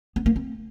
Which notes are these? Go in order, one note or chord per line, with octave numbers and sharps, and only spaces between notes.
B3
A#3
C4